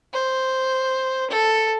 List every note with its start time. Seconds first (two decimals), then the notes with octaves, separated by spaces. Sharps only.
0.13 C5
1.31 A4